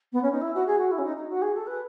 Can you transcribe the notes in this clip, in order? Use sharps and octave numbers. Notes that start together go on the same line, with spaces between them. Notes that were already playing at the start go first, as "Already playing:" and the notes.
B3
C#4
D#4
E4
F#4
G#4
F#4
E4
C#4
D#4
D#4
F#4
G#4
A4
B4